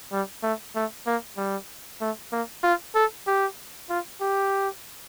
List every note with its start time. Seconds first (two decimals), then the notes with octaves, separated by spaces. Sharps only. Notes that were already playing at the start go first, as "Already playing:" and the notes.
0.12 G3
0.43 A3
0.75 A3
1.07 A#3
1.38 G3
2.01 A3
2.32 A#3
2.64 F4
2.95 A4
3.27 G4
3.90 F4
4.21 G4